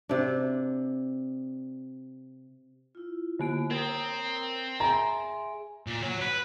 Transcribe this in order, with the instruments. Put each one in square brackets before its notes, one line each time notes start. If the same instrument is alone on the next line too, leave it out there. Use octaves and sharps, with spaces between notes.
[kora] C3 D4
[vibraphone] E4 F4
[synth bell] D3 A#3 D7
[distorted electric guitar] C4 [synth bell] A#4 [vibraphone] C#5 A#5 D#6
[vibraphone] G#4 E5 G#5 [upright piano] A#5 [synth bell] C6 D7
[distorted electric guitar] A#2
F#3
B4